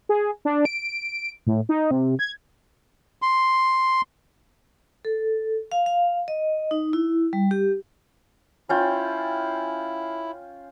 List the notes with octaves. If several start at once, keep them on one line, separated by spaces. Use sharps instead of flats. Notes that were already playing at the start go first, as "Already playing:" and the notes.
G#4
D4
D7
A2
D#4
C3
G#6
C6
A4
F5
F5
D#5
D#4
E4
G3
G4
C#4 E4 F4 G5